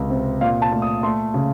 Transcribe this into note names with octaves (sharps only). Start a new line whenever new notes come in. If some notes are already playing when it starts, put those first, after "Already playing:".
Already playing: C#2 C3
C3
A#2 F5
A5
A3
D#6
A3 C6
C#3